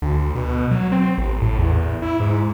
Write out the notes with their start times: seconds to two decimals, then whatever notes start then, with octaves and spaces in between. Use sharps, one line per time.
0.02 D2
0.35 B2
0.71 F#3
0.92 C4
1.18 A1
1.42 A2
1.58 E2
2.02 E4
2.20 G#2